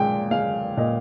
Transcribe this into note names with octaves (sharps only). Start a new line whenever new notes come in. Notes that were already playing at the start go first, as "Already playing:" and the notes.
Already playing: A#2 G#3 G5
G#3 F5
A#2 D#5